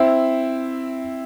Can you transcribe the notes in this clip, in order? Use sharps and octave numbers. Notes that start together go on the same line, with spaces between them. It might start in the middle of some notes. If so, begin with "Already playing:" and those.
Already playing: C4 E4